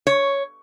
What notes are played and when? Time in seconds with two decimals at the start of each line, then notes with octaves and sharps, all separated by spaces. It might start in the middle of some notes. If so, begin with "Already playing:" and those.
0.07 C#5